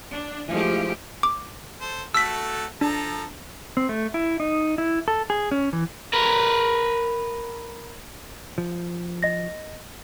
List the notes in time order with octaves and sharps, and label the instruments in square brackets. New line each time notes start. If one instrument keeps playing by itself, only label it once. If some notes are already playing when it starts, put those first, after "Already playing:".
[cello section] D4
F3 G#3 A3 E4 G4
[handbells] D6
[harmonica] A4 C5
[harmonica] A3 F#4 A4 [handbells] E6 B6
[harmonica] F3 A4 A#5 [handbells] D4
[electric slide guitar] C4
A3
E4
D#4
E4
A4
G#4
C#4
E3
[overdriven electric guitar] A#4 B4
[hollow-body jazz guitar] F3
[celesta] D#5 A#6